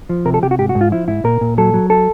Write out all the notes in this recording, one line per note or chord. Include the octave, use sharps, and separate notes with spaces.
F3
C3 A#4
A4
C3 G4
F#4
G#2 G4
F#4
G#2
F4
F3 E4
G#2 E4
A#2 A#4
A#2
F#3 A4
F#3
A4